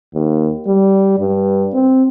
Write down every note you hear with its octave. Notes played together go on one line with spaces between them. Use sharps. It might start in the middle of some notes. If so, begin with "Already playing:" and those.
D#2
G3
G2
C4